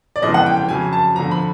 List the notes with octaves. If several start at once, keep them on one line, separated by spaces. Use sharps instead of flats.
D5
G1 F2 C#3 E3 G#3 D#5
F#5
G5
G5
F2 C#3 F#3 G#5
A5
F2 D3 F3 A#5
B5